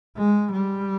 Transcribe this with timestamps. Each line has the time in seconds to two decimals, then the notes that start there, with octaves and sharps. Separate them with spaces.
0.17 G#3
0.52 G3